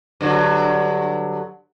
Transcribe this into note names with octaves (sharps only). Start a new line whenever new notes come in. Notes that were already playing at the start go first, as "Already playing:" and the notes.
G2 D3 F#3